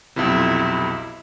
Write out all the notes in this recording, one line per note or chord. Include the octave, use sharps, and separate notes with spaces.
B1 F2 C3 E4